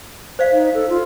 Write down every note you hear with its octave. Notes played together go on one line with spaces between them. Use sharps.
C5 D5 F5
D#4
A4
F4